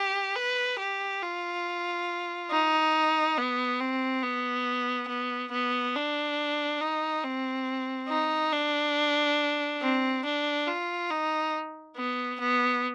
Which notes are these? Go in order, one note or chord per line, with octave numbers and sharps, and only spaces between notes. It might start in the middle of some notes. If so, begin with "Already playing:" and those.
Already playing: G4
B4
G4
F4
D#4
B3
C4
B3
B3
B3
D4
D#4
C4
D#4
D4
C4
D4
F4
D#4
B3
B3